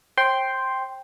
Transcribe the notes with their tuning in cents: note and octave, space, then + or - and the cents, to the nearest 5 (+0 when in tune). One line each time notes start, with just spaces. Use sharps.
C5 +35 G5 +0 C6 +0